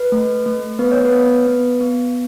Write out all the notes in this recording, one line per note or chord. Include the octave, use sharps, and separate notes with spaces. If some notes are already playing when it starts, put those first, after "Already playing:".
Already playing: B4
A3
A3
B3 B4
C#5
B4
B3
B3
B3